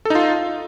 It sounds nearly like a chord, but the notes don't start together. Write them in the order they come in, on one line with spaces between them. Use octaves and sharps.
A4 D#4 F4